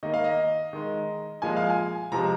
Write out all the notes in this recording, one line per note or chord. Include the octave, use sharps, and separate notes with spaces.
D#3 A#3 D#5
F5
D#5
D#3 G#3
A#2 F3 G#3 G#5
F5
G#5
C3 F3 G#3 A#5